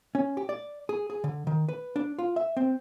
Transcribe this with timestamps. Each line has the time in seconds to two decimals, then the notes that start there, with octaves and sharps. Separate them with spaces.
0.15 C#4
0.37 G4
0.49 D5
0.89 G#4
1.10 G#4
1.24 D3
1.47 D#3
1.69 B4
1.96 D4
2.19 F4
2.36 E5
2.57 C4